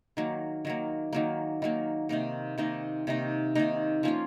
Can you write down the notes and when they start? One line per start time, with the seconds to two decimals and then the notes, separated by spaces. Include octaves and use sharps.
0.17 D#3 F#3 A#3
0.65 D#3 F#3 A#3
1.13 D#3 F#3 A#3
1.62 D#3 F#3 A#3
2.09 C3 D#3 A#3 D#4
2.58 C3 D#3 A#3 D#4
3.07 C3 D#3 A#3 D#4
3.55 C3 D#3 A#3 D#4
4.03 F3 A#3 C#4 F4